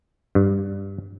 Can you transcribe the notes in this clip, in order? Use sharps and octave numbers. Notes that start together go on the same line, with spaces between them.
G2